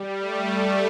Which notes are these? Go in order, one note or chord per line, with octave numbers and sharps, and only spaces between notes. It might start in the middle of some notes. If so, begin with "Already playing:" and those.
Already playing: G3
A3